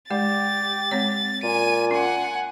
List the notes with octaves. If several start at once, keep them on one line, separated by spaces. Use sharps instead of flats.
G#3 G4 D5 A6
G#3 C4 C#5
A#2 G#5 D#7
C#4 F#5 G#5